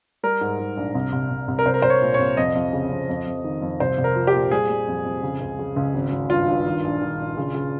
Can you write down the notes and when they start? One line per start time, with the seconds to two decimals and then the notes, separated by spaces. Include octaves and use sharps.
0.23 G3 A#4
0.41 G#2
0.60 G#2
0.77 A#1
0.95 C2
1.12 C2
1.31 C2
1.48 C2
1.59 A#4
1.66 C2 C5
1.74 A#4
1.82 C2 C5
1.90 C#5
2.02 A#2
2.14 C2 C#5
2.37 F2 D#5
2.55 F2
2.73 C#3
2.91 F2
3.09 F2
3.26 F2
3.44 D#3
3.62 F2
3.80 C2 C5
3.98 C2
4.04 A#4
4.15 F3
4.27 G4
4.34 A#2
4.51 G3 G#4
4.70 G3
4.88 F2
5.05 F2
5.23 C#3
5.41 C#2
5.59 C#3
5.76 C#2
5.95 G#1
6.12 G#1
6.30 G2 F4
6.47 G2
6.66 D#3
6.84 A#1
7.01 D#3
7.20 A#1
7.37 C#3
7.55 C#3